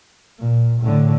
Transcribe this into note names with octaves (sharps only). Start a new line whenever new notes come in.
A#2
A2 D3